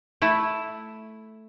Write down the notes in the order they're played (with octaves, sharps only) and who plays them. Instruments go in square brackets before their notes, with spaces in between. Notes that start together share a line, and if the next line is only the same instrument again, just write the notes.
[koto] A3 E4